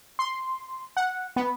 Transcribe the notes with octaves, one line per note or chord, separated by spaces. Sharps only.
C6
F#5
B3